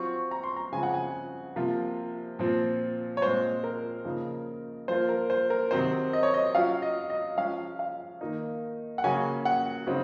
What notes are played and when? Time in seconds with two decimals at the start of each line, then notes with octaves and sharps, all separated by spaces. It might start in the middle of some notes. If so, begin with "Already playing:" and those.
Already playing: F#3 C4 F4 C#6
0.31 A#5
0.44 C6
0.56 A#5
0.72 C#3 F3 G#3 C4 G#5
0.83 F#5
0.94 G#5
1.56 C3 F3 A#3 F4
2.39 A#2 F3 C4
3.17 C#5
3.22 A#2 G#3 C4 F4 C5
3.64 A#4
4.05 C#3 F3 A#3 D#4
4.88 F3 A#3 F4 C5
5.09 A#4
5.30 C5
5.50 A#4
5.71 C3 D#3 F#3 C4 D#4 C5
6.13 D#5
6.23 C#5
6.34 D#5
6.55 F#3 C#4 F4 F5
6.82 D#5
7.10 D#5
7.37 F3 G#3 C#4 F5
7.79 F5
8.21 D#3 A#3 D#4
8.98 F#5
9.04 C#3 F#3 A#3 C#4 G#5
9.45 F#5
9.86 C#3 F#3 C4 D#4